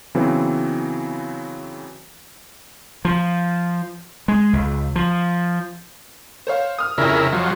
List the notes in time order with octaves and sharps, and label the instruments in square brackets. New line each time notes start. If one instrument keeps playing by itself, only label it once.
[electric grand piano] C#3 E3 F#3 B3 C4
[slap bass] F3
G#3
C#2
F3
[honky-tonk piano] C5 C#5 F5
D#6 F6
[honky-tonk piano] F1 F2 [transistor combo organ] C#3 E4 A#4
[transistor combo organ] F3 F#3